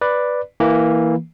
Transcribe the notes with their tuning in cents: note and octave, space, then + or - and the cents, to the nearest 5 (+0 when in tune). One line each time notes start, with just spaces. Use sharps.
B4 +0 D5 +5
E3 -10 A#3 +0